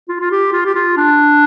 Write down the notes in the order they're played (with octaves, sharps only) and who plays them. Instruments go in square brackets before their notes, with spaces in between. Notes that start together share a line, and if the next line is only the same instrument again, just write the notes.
[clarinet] F4
F4
G4
F4
G4
F4
D4